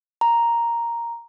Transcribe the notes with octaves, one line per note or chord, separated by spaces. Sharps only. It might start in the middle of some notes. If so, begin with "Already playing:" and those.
A#5